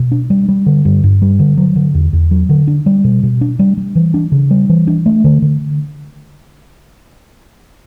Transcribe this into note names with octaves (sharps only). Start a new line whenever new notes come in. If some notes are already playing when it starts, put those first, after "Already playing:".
Already playing: B2
D4
G3
G3
D3
G2
G2
G3
D3
F#3
D3
E2
E2
F#3
D3
D4
G3
B2
B2
D4
G3
G3
E3
D4
C#3
G3
E3
D4
A3
D3
D3